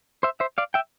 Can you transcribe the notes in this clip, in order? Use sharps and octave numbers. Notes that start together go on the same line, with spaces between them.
C5 E5
C5 E5
D5 F5
E5 G5